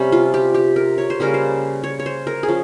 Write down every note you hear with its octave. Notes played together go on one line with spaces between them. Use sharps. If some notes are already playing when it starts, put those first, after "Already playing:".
Already playing: C3 G3 C#4 G4
F4
G4
G4
A#4
C#5
C5
C#3 G3 A#3 C#4 A#4
C5
C#5
C#5
C5
A#4
G#4
F3 C#4